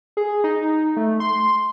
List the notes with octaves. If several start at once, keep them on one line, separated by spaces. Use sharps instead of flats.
G#4
D#4
A3
C6